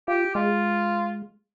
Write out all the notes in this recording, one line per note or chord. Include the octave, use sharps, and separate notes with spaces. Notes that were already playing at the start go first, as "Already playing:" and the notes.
F4 G4
G#3 F4